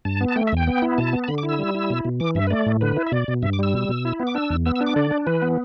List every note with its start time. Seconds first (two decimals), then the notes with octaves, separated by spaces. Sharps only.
0.05 G2 A5
0.21 B3
0.28 A5
0.36 A3 G5
0.47 E5
0.52 E2 G5
0.67 B3
0.82 E4
0.98 B2 A5
1.13 B3
1.24 A5
1.28 D3 B5
1.38 D6
1.43 E4
1.49 E6
1.59 G3
1.74 E4
1.90 B2
2.05 B2
2.20 E3 D6
2.35 G2 E5
2.47 B4
2.50 A3 D5
2.66 A2
2.81 D3 B4
2.97 E4
3.07 E5
3.12 B2 D5
3.28 B2
3.42 G2 E5
3.53 D6
3.59 G3 E6
3.74 B2
3.89 B2
4.05 E4
4.20 B3
4.27 D6
4.35 D4 E6
4.50 E2
4.66 B3 E6
4.76 E6
4.81 D4
4.87 D6
4.96 D3 D5
5.11 D4
5.27 E3 B4
5.42 B3